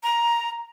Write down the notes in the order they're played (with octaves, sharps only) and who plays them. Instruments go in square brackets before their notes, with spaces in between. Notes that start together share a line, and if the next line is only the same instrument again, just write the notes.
[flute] A#5